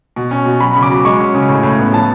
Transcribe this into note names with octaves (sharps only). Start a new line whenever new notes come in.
B2
C#4
B2
F#3 B5
C#3
D6
F#3
G#3 C#6
C#4
C#3
A2
A2
B3
F3 A5